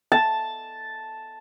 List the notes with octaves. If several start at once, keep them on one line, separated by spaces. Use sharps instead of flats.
A5